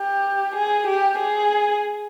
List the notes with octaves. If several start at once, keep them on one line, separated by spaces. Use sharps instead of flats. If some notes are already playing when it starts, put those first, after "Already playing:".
Already playing: G4
G#4
G4
G#4